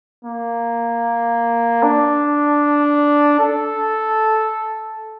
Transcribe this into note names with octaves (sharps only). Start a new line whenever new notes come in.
A#3
D4
A4